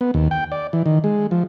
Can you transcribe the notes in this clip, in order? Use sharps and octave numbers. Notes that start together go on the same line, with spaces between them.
B3
D#2
G5
D5
E3
D#3
G#3
F3